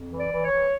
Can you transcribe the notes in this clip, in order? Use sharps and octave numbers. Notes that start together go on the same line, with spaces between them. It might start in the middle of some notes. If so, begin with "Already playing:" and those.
Already playing: F2
E3
D5
E3
C#5
E3